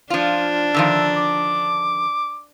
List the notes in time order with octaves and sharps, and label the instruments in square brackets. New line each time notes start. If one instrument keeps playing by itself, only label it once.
[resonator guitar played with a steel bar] F3 F4 [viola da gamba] D4
[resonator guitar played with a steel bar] D3 D#3 F3 [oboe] E5
[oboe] D6